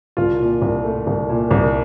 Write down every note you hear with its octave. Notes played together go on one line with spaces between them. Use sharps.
C2 F4
A#2
C2
A3
C2
A#2
C2